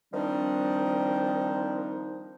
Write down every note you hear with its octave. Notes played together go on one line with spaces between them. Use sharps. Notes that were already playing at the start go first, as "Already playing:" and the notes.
D#3 F3 G3 C4 D4 D#4